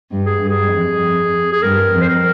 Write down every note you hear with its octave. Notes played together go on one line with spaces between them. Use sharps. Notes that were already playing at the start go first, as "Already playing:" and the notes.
G2
G#4
G2
G#4
F2
G#4
G2 A#4
F2
C5
A#4